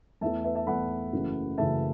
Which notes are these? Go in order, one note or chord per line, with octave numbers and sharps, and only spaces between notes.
E2 E3 A3 E5 A5
B4 E5
E5 A5
E2 E3 A3 F#5 B5
F#1 F#2 C#3 E3 A3
F#1 F#2 C#3 E3 A3 E5 A5